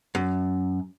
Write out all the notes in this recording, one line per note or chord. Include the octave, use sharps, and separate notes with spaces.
F#2